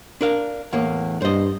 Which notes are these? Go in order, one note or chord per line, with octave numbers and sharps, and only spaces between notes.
D4 A#4 F5
E2 A2 A#3
G2 C5 D#5